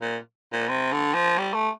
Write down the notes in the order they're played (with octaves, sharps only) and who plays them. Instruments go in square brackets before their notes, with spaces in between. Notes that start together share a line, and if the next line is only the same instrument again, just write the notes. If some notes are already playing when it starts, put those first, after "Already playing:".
[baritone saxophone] A#2
A#2
C3
D3
F3
G3
A3